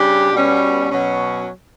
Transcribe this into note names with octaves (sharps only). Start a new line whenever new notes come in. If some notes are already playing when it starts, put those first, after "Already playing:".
Already playing: C#3 G3 D4 G4
B2 G3 C#4
B2 F#3 C#4